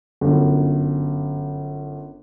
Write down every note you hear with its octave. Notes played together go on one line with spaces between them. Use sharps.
G1 F#2